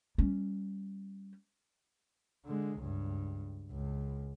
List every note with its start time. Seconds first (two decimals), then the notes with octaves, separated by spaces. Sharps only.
0.18 G3 C#4
2.46 D3 G#3
2.79 C#2 G2
3.71 C#2